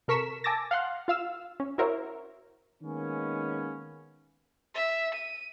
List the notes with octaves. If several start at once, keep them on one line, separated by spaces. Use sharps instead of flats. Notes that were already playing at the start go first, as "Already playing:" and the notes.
C3 A4 A#4 C#6 B6 E7
G#5 A5 D6 E6 A6 A#6
F5 F#5 C6 F#6
F4 F5 E6
C#4
E4 F#4 A#4 C5 C#5 E5
D#3 G#3 A#3 B3 C#4
E5
D#7